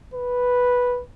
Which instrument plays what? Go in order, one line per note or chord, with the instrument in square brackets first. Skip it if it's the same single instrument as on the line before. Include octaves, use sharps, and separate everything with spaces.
[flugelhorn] B4